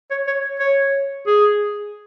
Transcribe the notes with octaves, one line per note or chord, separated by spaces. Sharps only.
C#5
C#5
C#5
G#4